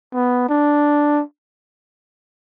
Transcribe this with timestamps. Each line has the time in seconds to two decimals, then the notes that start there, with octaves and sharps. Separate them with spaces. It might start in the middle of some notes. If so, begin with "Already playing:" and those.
0.15 B3
0.49 D4